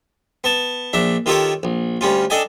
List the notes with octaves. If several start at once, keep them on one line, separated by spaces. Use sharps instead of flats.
B3 A5
A#1 D4 E5
D#3 F4 G4 A4 A#4 C#5
A#1
D2 G3 C#4 F4
D4 A4 D5 D#5 G5 G#5